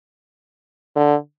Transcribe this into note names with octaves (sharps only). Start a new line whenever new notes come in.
D3